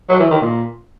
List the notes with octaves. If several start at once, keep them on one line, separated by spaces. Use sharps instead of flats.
F#3
E3
D#3
A#2